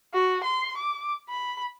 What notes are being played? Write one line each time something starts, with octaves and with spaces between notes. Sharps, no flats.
F#4
C6
D6
B5